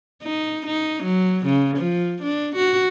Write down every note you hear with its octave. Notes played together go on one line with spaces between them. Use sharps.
D#4
D#4
F#3
C#3
F3
D4
F#4